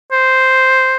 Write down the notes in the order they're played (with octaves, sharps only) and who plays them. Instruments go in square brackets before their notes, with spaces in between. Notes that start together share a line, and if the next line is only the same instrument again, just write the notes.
[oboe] C5